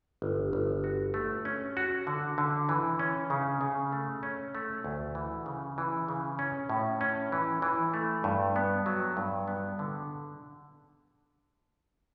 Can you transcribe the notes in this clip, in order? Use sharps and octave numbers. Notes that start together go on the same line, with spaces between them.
G1
G1
F#4
A3
C#4
F#4
D3
D3
E3
C#4
C#3
C#3
A3
C#4
A3
D2
E3
C#3
E3
C#3
C#4
A2
C#4
E3
E3
A3
G2
B3
F#3
G2
B3
D3